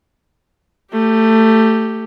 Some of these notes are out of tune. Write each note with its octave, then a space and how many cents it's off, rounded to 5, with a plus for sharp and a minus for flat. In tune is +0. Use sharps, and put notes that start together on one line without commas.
A3 +15 G4 +0